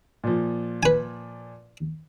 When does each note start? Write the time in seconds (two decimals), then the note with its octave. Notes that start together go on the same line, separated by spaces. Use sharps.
0.24 A#2 F3
0.83 B4 G#5